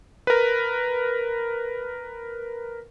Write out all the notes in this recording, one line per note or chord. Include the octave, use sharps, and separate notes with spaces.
A#4 B4